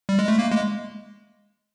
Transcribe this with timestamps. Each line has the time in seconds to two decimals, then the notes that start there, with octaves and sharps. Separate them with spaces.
0.09 G3
0.19 G#3
0.28 A3
0.38 A#3
0.51 G#3